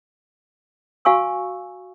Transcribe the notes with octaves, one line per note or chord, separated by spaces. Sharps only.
F#4 F5 G#5 C#6 E6